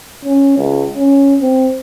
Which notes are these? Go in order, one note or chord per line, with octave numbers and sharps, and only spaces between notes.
C#4
C#2
C#4
C4